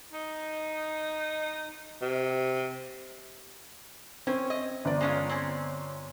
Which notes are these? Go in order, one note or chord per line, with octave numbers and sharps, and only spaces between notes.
D#4
C3
C4 C#4
D#5
G1 D5
G#3 C#4 F4
C4 C#4